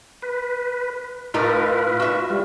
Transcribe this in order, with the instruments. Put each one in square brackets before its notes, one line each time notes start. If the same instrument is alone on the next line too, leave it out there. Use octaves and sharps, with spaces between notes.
[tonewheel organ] B4
[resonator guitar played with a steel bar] A2 D#4 A#4 [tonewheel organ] F4 B4
[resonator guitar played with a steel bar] F#4 E5
[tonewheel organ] G3 F4